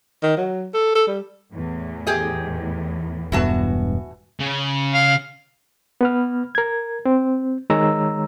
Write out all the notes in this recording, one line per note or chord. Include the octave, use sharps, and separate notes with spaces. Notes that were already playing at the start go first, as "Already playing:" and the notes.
D#3
F#3
A4
A4
G3
E2 A2
G4 G#4 D#5
E1 G2 E3 B3 F#4 A5
C#3
F5
B3 B4 F6
A#4 G#6
C4
D#3 G#3 C#5 A#5 E6